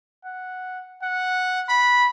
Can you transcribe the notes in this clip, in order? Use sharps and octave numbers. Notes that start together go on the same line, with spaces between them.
F#5
F#5
B5